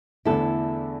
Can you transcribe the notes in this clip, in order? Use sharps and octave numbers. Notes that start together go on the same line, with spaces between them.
E2 D3 A3 D4 E4 A4